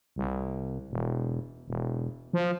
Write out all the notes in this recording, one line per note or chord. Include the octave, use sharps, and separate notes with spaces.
C2
E1
E1
F3